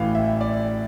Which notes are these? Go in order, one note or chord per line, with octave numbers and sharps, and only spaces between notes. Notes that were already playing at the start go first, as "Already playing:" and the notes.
Already playing: A1 A2 E3 F5 G5
E5
D5